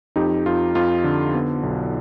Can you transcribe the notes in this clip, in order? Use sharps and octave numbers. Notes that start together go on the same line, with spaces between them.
F2 D#4 G4
F2 F4
F2 F4
D3
B3
B1